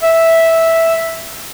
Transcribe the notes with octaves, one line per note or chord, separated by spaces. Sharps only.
E5